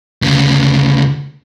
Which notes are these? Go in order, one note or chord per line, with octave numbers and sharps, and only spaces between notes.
D2 C#3